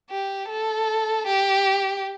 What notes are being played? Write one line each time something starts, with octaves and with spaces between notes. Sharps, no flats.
G4
A4
G4